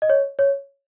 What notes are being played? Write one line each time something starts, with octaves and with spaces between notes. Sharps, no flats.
D#5
C#5
C#5